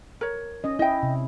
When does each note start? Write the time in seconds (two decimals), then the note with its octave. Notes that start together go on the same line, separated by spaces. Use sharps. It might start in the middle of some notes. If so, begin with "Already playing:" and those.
0.21 A#4 C#5
0.64 C#4 D#5
0.79 E4 D#5 G5
1.03 C3